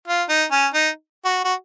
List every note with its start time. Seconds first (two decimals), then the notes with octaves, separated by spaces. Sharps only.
0.08 F4
0.29 D#4
0.51 C#4
0.74 D#4
1.25 F#4
1.44 F#4